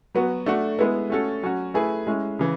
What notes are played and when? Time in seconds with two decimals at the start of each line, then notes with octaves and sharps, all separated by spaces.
0.15 F#3 B3 F#4
0.46 A3 D4 F#4
0.79 G#3 B3 E4 B4
1.10 A3 C#4 F#4 A4
1.43 F#3 C#4 F#4
1.74 A3 E4 G#4 B4
2.07 G#3 C#4 E4
2.39 C#3 E3